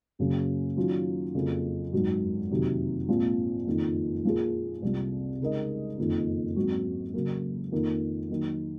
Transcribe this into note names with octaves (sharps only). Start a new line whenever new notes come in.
F#1 F#2 C#3 F#3 C#4
D#3 F#3 C#4 F4
F2 C#3 F#3 A#3
G#1 F#2 D#3 F#3
F#1 F2 C3 D#3 F#3
A#1 G#2 F3 C4
F#1 F2 D#3
A#2 F3 A#3 F4 G#4
C2 C3 F3
C#3 G#3 D#4 A#4 D#5
F#1 F2 D#3
G#2 F#3 C4 F#4
C#3 F#3 A#3
F2 D#3 A#3
D#3 F#3 A#3